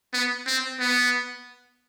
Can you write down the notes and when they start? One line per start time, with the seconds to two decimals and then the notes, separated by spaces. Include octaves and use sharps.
0.14 B3
0.47 C4
0.80 B3